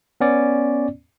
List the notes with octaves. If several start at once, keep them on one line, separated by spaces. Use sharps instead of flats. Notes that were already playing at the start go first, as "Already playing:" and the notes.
B3 C#4 D5